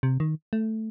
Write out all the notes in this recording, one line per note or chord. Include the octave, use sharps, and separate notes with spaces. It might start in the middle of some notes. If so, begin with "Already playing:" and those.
C3
D#3
A3